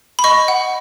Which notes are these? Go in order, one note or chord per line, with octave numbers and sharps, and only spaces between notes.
B5
D#5 C#6
F#5